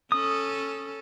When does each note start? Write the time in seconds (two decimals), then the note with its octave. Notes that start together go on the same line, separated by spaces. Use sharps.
0.12 C#4 A4 D#6